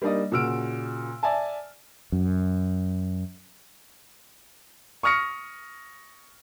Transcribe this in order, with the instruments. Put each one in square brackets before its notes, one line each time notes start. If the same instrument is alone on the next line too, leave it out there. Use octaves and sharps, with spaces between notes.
[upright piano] G3 A#3 D4 D#4 D5 D#5
A#2 C#3 F#4 E6 F6 D7
D5 E5 G#5 A5
[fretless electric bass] F#2
[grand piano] C#6 D#6 F6 A#6 C#7